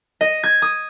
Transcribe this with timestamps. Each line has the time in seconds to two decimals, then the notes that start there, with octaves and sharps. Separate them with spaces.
0.21 D#5
0.44 G#6
0.62 D#6